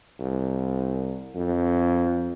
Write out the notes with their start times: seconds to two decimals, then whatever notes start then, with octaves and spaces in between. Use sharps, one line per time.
0.20 C2
1.35 F2